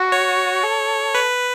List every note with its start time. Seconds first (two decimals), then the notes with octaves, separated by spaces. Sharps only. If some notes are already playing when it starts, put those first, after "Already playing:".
Already playing: F#4
0.12 C#5
0.63 A4
1.15 B4